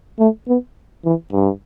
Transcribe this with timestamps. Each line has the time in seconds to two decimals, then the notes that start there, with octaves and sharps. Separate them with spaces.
0.19 A3
0.48 B3
1.05 E3
1.32 G2